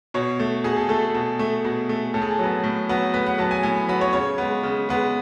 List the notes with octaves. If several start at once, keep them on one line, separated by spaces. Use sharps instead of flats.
B2 C#5
A3
B2 G#4
A4
A3 A4
B2
A3
B2
A3
A2 A4
G#4
A4
F#3 B3
A2
F#3 B3
A2 B4
F#5
F#3 B3 A5
G#5
A2 G#5
B5
F#3 B3 B5
C#5
C#3 C#5
G#3 B3
C#3
G#3 B3